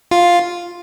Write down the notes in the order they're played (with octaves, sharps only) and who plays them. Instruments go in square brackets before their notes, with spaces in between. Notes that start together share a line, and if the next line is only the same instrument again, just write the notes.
[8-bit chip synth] F4